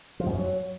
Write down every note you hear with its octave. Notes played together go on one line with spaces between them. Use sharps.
F3
G#2
F#2
F#3